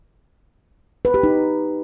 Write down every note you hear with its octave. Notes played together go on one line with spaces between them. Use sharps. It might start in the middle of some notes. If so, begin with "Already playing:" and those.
B4
G4
D#4